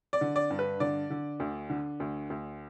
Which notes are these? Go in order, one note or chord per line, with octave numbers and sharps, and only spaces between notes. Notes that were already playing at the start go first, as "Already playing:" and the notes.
D5
D3
D5
G2
B4
D3 D5
D3
D2
D3
D2
D2